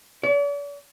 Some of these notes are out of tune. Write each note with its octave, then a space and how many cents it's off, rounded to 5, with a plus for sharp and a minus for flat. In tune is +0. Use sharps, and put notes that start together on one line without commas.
D5 -45